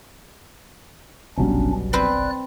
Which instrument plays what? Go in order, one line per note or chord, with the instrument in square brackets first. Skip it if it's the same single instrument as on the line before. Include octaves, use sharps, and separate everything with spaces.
[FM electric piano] G1 C2 [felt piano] B2 F#3 G3 [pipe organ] C#4 D4
[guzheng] C4 B4 C5 [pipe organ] D5 F#6